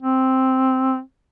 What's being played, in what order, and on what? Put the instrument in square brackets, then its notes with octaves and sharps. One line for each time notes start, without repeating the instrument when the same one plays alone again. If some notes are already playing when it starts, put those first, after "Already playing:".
[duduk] C4